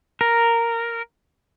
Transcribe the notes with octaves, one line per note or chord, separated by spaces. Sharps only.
A#4